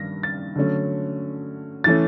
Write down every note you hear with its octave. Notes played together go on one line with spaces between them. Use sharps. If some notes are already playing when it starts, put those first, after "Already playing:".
Already playing: G2 D#3 A#6
A6
D3 F#3 A3 C#4
E3 A3 C#4 A6